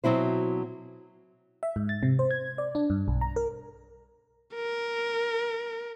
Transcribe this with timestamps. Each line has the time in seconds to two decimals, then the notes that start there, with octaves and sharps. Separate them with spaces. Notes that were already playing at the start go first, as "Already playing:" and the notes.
0.04 B2 F#3 C4 E4 C5
1.63 E5
1.76 G#2
1.89 A6
2.03 C3
2.19 C5
2.31 G#6
2.58 D5
2.75 D4
2.90 G2
3.08 B1
3.21 A#5
3.36 A#4
4.55 A#4